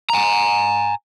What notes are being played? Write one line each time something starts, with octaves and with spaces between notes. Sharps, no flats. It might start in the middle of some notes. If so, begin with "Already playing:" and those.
G#5 A#5